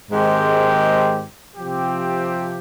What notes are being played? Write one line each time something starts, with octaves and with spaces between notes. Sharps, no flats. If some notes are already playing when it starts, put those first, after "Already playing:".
G#2 D#3 G#3 C4 G4
C3 F3 C4 G4